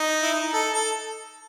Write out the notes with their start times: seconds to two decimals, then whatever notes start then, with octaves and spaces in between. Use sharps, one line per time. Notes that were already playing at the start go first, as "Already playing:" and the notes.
Already playing: D#4
0.22 E4
0.32 D#4
0.53 A4
0.74 A4